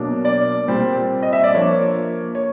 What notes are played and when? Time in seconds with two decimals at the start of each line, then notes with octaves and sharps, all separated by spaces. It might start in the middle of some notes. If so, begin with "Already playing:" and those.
Already playing: B2 F#3 A#3 D4
0.25 D5
0.68 A#2 G3 C4
1.22 D#5
1.33 E5
1.44 D5
1.54 F3 A#3 D4 C#5
2.35 C#5